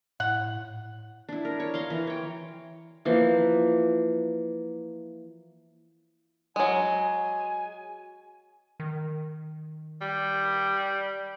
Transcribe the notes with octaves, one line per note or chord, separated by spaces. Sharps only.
A2 F#5
D4 E4
A#4
C#5
F5 A#5 C6
E3 A#4
C#5 G5
E3 F3 A#3
F#3 G#3 G#5
D#3
G3